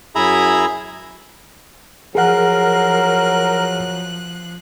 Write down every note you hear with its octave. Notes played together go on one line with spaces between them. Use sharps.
F#2 E4 G#4 E5 A#5 B5
F3 F#3 G#4 A#4 F#5 F#6